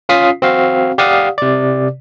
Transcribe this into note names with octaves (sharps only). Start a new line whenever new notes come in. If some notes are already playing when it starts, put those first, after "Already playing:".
C#4 F4 F5 D#6 B6 C7
C4 F#4 F5
G4 D5 F5 F#5 D#6
C3 D5